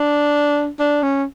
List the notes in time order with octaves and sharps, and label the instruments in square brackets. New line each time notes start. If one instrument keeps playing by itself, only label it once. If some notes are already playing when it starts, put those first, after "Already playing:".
Already playing: [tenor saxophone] D4
D4
C#4